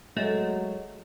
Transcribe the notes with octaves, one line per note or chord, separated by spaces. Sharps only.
F#3 G#3 A3